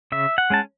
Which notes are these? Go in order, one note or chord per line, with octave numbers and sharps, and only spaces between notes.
C#3 E5
F#5
G#3 C#4 A5